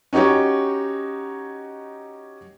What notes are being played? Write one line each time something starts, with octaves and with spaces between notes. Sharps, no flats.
C#4 D#4 F#4 G4 C#5